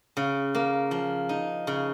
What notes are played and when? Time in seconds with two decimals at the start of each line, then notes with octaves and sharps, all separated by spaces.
0.17 C#3
0.55 A#3
0.91 F3
1.29 D#4
1.67 C#3